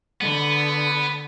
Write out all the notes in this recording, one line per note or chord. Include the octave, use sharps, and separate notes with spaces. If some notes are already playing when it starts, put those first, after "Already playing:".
D3 B3